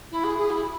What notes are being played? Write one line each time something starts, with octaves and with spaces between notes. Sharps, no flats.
E4
G#4
G#4
E4